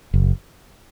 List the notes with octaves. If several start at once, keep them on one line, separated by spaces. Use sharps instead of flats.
F#1